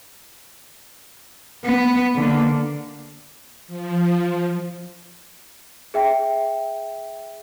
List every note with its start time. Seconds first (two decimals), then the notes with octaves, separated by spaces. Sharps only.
1.65 B3
2.15 D3 A#3
3.67 F3
5.94 G#4 E5 G5